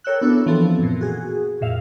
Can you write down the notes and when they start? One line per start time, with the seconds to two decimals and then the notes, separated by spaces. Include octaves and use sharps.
0.04 A4 A#4 C#5 G5 E6 F#6
0.21 B3 D4 E4 F#4 A4 C#5
0.46 E3 F3 B3 C4 A4
0.79 F#2 A#2
1.01 F#4 G#4
1.61 F2 A#2 E5 F5